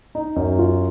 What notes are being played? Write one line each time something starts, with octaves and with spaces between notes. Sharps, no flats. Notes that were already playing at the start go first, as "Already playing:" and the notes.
D#4
F#2
F4